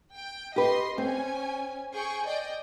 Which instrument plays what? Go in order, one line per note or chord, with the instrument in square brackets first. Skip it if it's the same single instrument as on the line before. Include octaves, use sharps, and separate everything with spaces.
[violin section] G5
[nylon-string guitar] G4 B4 [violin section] D#5 C6
[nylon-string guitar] C4 [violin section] C#4 G#5
[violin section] G#4 G5 C#6
D5 D#5 G5